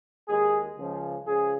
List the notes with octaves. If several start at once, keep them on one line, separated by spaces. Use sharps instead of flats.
D#2 D#3 G#3 G#4
C#2 C#3 F3 G#3
C#2 C#3 F3 G#4